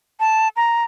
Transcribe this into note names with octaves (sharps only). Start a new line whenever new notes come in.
A5
A#5